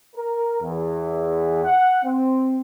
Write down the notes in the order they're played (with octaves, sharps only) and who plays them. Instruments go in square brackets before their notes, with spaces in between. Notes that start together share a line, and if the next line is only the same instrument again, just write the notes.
[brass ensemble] A#4
E2
F#5
C4